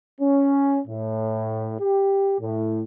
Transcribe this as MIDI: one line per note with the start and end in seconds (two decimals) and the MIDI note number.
0.21 0.80 61
0.87 1.76 45
1.81 2.36 67
2.41 2.83 45